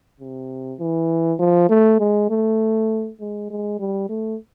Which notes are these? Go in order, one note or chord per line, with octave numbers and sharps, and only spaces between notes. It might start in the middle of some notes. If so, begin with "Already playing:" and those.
C3
E3
F3
A3
G#3
A3
G#3
G#3
G3
A3